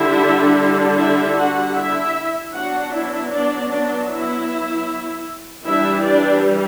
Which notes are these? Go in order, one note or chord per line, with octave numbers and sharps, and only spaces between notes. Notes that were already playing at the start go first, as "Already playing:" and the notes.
Already playing: D3 G3 D4 E4 E5
E4 E5
F#4 F#5
E4 E5
F#3 B3 D4 F#4 F#5
E4 E5
D4 D5
D4 D5
E4 E5
E3 G3 D4 E4 E5
D4 D5